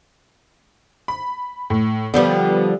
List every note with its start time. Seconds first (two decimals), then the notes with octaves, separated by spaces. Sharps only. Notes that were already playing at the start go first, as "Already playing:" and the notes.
1.08 B5
1.70 A2
2.14 D3 F3 G3 B3